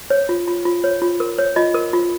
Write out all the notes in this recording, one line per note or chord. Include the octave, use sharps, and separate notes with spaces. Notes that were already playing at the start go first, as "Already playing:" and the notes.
C#5
F4
F4
F4
C#5
F4
A#4
C#5
F4 D#5
A#4
F4